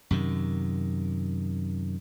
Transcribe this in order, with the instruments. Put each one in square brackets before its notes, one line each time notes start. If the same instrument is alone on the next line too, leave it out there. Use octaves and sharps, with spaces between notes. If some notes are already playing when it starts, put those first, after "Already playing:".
[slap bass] F#2 C3 D#3